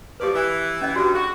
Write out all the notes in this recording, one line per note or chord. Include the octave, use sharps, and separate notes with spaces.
A2 F3 G4 B4 D5
E3
C#4 D#5
G2 F#4
F#4 G#4